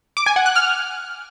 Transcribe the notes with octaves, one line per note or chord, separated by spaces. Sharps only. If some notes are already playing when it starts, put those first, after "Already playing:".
D6
G#5
F#5
F#6
F6